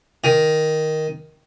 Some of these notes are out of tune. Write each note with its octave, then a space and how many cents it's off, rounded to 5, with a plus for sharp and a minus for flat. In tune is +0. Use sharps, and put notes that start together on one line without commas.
D#3 +5